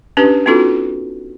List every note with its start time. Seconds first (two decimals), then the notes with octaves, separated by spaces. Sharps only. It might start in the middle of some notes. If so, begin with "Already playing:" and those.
0.17 C#4 D4 G4 B4
0.46 B3 C#4 D#4 F4 F#4 A4